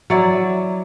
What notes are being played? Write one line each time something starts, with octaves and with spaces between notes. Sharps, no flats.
F#3 E4 D5